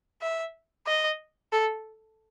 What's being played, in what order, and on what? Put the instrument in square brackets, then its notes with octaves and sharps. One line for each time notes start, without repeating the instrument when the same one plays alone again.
[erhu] E5
D#5
A4